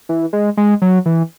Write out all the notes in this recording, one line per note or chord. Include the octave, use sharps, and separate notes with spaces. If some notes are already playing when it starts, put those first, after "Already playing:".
E3
G#3
G#3
F#3
E3